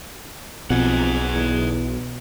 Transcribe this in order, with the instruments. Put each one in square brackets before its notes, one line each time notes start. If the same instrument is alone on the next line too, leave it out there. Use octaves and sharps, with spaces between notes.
[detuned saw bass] B1 [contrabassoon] F2 [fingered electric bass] B2 [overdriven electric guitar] G#4 F#5
[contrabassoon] E2